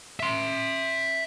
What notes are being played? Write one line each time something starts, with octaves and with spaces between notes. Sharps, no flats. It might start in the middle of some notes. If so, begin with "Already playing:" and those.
E5 C6